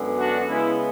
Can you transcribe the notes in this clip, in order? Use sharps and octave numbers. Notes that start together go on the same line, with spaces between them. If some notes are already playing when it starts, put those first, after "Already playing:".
Already playing: F#2 D3 G#3 B3
D4 F#4
C#3 G#3 B3 C#4 E4